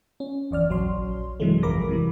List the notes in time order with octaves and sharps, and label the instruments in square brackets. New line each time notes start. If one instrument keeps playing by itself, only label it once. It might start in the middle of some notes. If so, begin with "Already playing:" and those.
[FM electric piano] C#4
G1 E2 D5 F6
A#1 F#3 C#5 C6
G2 C3 E3 F#3 G#3 A3
A1 F2 A#4 B5 D6 A#6
C3 E3 G3